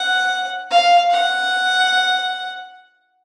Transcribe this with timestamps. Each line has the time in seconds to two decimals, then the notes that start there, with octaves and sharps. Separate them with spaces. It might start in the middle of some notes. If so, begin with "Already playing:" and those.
Already playing: F#5
0.71 F5
1.10 F#5